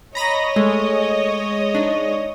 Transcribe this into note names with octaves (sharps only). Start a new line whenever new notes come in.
C#5 D#5 A#5 B5 A#6
G#3 A3
D4 D#4